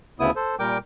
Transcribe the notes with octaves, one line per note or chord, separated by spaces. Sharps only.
D2 C#3 B3 E4 D#6
A4 C5
A#2 G3 A#4 G5 D6